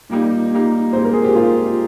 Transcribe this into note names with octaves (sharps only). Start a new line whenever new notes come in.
A#2 G3 A#3 D#4
A#2 G3 A#3 D#4
A#2 G#3 C4 D#4 C5
A#4
G#4
G4
A#2 G#3 C4 D#4 F4